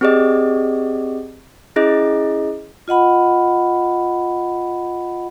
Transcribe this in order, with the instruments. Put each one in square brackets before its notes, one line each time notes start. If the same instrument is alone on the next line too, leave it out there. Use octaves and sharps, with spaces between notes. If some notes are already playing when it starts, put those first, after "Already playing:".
[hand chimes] C4 G4 G#4 D5 D#5
C#4 E4 G#4 D#5
[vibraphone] F4 D#5 F#5 B5